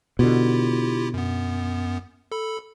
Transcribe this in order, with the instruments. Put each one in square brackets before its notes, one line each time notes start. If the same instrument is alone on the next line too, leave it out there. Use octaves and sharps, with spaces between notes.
[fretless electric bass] B2 D3 [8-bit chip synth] E4 F4 G4
[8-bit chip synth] F#2 B3
A4 B5